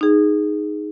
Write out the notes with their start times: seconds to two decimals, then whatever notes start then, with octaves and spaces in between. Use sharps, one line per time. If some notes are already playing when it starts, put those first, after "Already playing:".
0.01 D#4 G#4